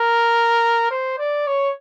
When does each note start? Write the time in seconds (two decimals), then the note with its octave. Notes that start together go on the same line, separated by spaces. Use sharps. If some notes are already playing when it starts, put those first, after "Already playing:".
Already playing: A#4
0.91 C5
1.19 D5
1.47 C#5